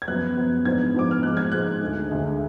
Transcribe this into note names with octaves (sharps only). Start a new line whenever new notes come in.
G#6
F#2 F3 B3 F#6
F#2 F3 B3
G#2 F3 B3 D4 G#6
G#2 F3 B3 D4 D6
F6
G#2 F3 G#3 F#6
G#6
G#2 F3 G#3 F#6
D2 D3 G#3
D2 D3 G#3